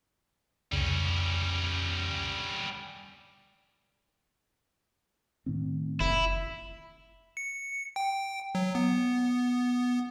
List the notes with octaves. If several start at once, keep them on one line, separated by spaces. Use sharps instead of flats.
C2 F2 C#3 G3 C#4
A2 D#3 C4
F#1 E4
C#7
G5
F#3
B3